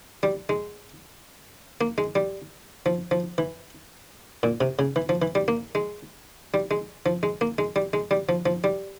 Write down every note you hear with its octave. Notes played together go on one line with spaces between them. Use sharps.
G3
G#3
A#3
G#3
G3
F3
F3
E3
A#2
C3
C#3
E3
F3
E3
G3
A#3
G#3
G3
G#3
F3
G#3
A#3
G#3
G3
G#3
G3
F3
F3
G3